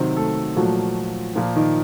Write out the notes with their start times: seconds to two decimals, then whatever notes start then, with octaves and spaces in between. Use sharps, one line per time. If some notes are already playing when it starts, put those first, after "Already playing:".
Already playing: C3 D#3 F#3 C4 C5
0.17 A3 A4
0.56 A#2 F3 F#3 A3 F#4
1.35 A#2 F3 A#3 F4
1.56 D#3 D#4